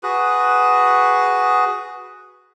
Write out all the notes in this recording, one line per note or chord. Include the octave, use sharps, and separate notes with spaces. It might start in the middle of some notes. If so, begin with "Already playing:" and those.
F#4 G#4 B4